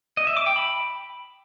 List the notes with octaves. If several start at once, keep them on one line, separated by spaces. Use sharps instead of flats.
D#5
E5
D6
G5
B5